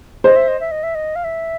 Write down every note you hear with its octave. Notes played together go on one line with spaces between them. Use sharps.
C5 D#5
E5
D#5
E5
D#5
E5
D#5
F5
E5